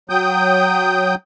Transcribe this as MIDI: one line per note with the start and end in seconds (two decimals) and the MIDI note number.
0.10 1.15 54
0.10 1.15 79
0.10 1.15 87
0.10 1.15 91